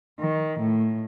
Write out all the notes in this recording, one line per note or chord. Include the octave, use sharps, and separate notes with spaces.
D#3
A2